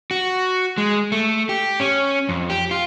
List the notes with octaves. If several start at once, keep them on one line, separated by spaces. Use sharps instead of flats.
F#4
G#3
A3
G4
C#4
F2
G4
F4